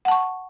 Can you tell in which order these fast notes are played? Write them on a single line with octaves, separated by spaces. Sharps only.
F#5 A5 C#6